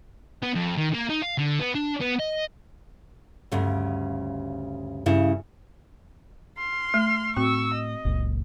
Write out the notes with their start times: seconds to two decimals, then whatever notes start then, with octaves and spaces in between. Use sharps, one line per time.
0.42 B3
0.55 F2
0.77 D#3
0.94 A#3
1.09 D#4
1.22 F5
1.38 D3
1.60 B3
1.75 D4
2.01 B3
2.20 D#5
3.52 D2 G2 C#3
5.06 G2 C#3 E4
6.58 C6 F6
6.94 A3
7.37 A2 C4 F#4 C#6 E6
7.74 D#5
8.05 F#1 C#2 A#2